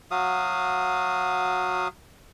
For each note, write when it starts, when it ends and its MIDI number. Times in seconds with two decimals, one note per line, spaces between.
0.11 1.88 54
0.11 1.88 66
0.11 1.88 77
0.11 1.88 87